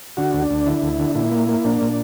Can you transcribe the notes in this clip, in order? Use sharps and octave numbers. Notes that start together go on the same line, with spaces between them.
D3 F#4
D2
D4
D2
D3 E4
D2
D3
A#2 E4
A#3
A#3
A#2 D4
A#2